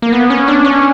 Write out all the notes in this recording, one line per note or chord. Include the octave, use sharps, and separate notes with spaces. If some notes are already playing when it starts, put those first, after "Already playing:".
A#3
B3
C#4
D4
C#4